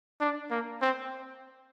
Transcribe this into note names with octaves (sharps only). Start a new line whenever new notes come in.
D4
A#3
C4